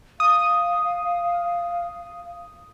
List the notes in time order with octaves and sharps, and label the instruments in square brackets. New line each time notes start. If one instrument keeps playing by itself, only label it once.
[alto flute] F5 [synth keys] D#6